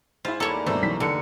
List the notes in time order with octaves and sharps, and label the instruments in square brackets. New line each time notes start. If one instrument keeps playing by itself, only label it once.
[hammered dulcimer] G#2 F5 G#5 [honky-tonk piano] E4 C5 [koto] F4
[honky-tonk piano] E2 [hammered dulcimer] G3 A#3 E4 [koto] A4 C#5
[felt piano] G1 [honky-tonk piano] F#2 B2 C5 [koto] A3 [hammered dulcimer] D#4 D5 G#5
[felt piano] B1 E3 B6 [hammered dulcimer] G3
[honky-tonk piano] F1 C#7 [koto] D3